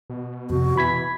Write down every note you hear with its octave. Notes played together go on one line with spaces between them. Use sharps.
B2
F2 C3 F#4
E3 B5 G#6 B6